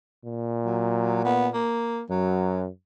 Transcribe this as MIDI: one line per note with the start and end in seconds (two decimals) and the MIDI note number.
0.25 1.60 46
0.65 1.23 54
1.25 1.48 59
1.53 2.02 58
2.10 2.69 42
2.10 2.62 54